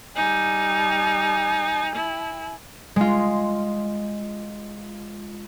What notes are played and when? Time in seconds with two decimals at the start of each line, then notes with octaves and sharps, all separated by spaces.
0.16 G3 D#4 G#5
1.96 E4
2.96 G#3 F4